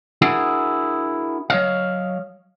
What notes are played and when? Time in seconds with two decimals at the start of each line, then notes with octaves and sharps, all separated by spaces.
0.22 D4 E4 F#4 G#4 A#4 F#5
1.50 F#3 C#5 D#5 F5